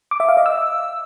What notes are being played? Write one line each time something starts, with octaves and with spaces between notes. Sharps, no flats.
D6
E5
F5
D#5
E6